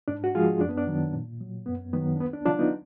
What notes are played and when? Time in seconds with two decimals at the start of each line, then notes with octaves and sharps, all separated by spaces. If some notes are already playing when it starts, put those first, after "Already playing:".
0.08 G#2 D4
0.24 F#4
0.35 F3 G#3 F4 G#4
0.60 F#2 D4
0.69 B3
0.78 D4
0.87 D#3 F#3
1.13 A#2
1.40 F#3
1.66 F#2 B3
1.93 D#3 F#3 B3
2.16 D4
2.19 D2 B3
2.33 D4
2.45 D3 F#3 D4 F4
2.59 B3 D#4